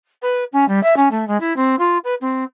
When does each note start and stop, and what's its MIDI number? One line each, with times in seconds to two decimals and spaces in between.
0.22 0.43 71
0.52 0.67 61
0.68 0.81 55
0.83 0.94 76
0.96 1.08 61
1.11 1.27 57
1.27 1.39 56
1.40 1.55 64
1.56 1.75 60
1.79 1.97 65
2.04 2.14 71
2.21 2.44 60